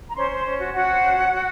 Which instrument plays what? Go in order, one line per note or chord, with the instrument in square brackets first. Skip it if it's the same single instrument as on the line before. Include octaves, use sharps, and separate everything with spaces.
[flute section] A#5
C#4 C5 C6
C5
C#4
F#4
C#4 F#4 F#5
C5
C#4
F#4
F#4